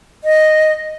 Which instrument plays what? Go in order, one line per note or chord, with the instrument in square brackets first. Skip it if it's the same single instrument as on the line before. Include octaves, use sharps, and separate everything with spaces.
[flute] D#5